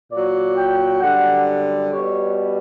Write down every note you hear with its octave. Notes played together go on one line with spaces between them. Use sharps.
A#2 F#3 D5
G5
F#2 D3 G3 F#5
B2 G3 C#5